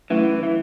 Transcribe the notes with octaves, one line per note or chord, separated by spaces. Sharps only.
E3 F#3 A3 C#4 E4
E3